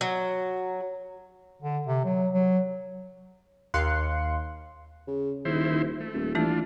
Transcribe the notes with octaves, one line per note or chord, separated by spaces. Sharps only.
F#3
D3
C3
F#3
F#3
D#2 F5 C6 F#6 C7 C#7
C#3
D#1 D#3 E4 C5
A3
D#1
E3 A3 D4 E4 F4